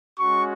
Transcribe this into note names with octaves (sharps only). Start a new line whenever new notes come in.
G#3 C#4 F#4 C#6